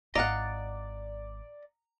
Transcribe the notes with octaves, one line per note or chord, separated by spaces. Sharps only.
G#1 E4 D5 D#5 F5 F#5 A#5 F#6